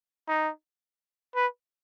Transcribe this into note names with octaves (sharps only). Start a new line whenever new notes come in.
D#4
B4